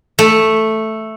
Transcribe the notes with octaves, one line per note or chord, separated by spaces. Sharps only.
A3